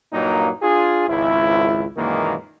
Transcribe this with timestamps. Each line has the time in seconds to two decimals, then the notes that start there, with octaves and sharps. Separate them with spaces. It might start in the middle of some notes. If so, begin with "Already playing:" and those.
0.13 G2 A#2 F#3 A#3 D#4
0.61 D4 F4 G#4
1.08 G#1 C#2 E4
1.96 F#2 A#2 D#3 E3 G#3 A#3